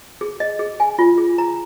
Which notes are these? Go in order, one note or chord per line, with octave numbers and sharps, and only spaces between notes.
G#4
D#5
G#4
G#5
F4
G#4
A#5